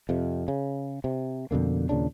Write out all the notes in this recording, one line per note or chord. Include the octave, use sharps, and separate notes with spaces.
F2 C3
C#3
C3
F2 B2 D3 A#3
D#2 A#2 C#3 D4